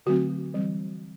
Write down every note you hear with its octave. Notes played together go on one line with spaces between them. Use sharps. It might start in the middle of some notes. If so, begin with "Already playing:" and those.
D3 F#3 A3 C4 F#4
E3 G3 C4